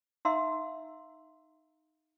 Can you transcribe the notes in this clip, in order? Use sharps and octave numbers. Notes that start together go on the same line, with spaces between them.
D#4 E5 F5 A#5 C6 E6